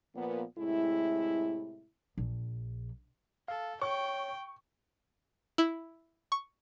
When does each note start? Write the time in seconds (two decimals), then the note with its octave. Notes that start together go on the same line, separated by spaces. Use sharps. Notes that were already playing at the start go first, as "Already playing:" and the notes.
0.15 A#2 F3 A#3 B3
0.58 A2 C3 G#3 E4
2.18 A#1
3.48 A4 F5
3.82 C#5 G5 C#6
5.58 E4
6.32 C#6